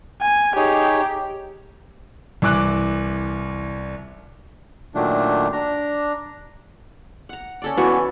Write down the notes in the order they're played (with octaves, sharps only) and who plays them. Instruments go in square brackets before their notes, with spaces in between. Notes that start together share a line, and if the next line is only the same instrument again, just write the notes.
[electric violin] G#5
[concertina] D#4 G#4 C#5 [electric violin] G4
[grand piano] C2 E3 D6 F#6
[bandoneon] A#2 D#3 F#3 A3 D4
D4 A#5
[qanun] F#5 A#5
C#4 A4 D5
[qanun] E3 [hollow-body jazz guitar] B3 F#4